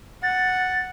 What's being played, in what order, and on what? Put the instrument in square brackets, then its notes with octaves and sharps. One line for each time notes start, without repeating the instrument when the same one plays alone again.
[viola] F#5 [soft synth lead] A6